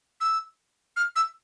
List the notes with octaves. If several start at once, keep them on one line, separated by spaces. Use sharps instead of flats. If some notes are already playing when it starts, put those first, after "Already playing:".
E6
F6
E6